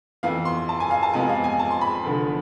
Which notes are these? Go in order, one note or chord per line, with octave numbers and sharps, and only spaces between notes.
F2 E3 B3 F5
C6
A5
G#5
F5
A5
F2 C3 F3 G#3 B3 G#5
F5
G#5
A5
C6
B5
F1 E2 D3 F3